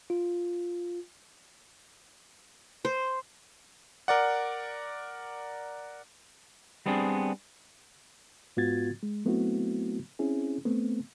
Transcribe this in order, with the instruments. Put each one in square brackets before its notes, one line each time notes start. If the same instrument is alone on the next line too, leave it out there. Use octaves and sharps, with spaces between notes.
[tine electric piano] F4
[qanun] C5
[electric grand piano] A#4 D5 F#5
[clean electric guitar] G3 B3 C4 D4 G#4
[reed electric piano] G#2 B3 F4 F#4 G#6 A6
G#3
F#3 A3 B3 C4 E4 F#4
C4 C#4 E4 G#4
A3 B3 C4